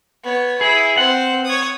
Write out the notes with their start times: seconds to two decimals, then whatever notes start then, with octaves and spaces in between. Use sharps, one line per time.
0.24 B3 C#5
0.61 E4 G#4
0.97 C4 C5 F#5
1.45 C#5 D#6